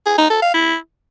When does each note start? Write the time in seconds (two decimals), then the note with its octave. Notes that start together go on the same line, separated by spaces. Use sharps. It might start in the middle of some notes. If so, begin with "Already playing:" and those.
0.06 G#4
0.18 D#4
0.30 A4
0.42 F5
0.54 E4